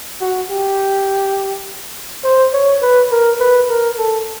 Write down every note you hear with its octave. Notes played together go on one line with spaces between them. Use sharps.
F#4
G4
C5
C#5
B4
A#4
B4
A#4
A4